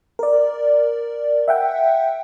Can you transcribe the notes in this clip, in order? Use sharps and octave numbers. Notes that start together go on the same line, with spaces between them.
A#4 D5
E5 F#5 G5